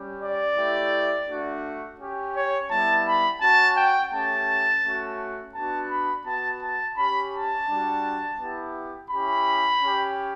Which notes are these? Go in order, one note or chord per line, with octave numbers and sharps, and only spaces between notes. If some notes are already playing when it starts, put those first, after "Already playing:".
Already playing: G3 C#4 G4
D5
A3 E4 G4
A3 D4 F#4
C#4 G4
C#5
G3 B3 E4 A5
B5
C#4 F#4 A5
G5
A3 C#4 G4 A5
A3 C#4 F#4
B3 D4 F#4 A5
B5
B3 F#4 A5
A5
C#4 G4 B5
A5
G3 D4 F#4
B3 E4 G4
C#4 E4 G4 B5
C#4 G4